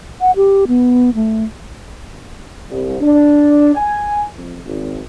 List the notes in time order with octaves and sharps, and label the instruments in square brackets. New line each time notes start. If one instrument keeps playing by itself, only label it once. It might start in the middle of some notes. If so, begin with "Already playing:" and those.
[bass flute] F#5
G4
B3
A3
[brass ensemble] C2
D4
G#5
F2
G#1